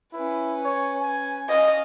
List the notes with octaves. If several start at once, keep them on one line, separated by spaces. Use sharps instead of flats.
C#4 E4 B4
C#5
G#5
C#4 D#5 F5